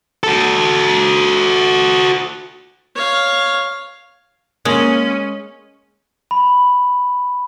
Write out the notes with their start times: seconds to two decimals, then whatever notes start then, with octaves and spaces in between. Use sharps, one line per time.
0.23 F#4 A4
2.95 C#5 F5
4.65 G#3 A#3 C#4
6.31 B5